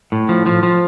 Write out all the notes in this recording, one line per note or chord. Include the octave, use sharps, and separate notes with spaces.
A2
F3
F3
F3